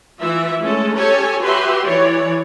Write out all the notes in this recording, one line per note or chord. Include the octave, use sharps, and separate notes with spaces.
E3 E4 F4 E5
G#3 A3 C#4 A4
C#4 G4 A4 C#5 G#5
F#4 G4 B4 E5 C6
E3 C#5 D5